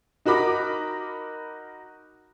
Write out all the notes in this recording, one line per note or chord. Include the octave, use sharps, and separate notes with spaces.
D#4 F#4 A#4 B5 D6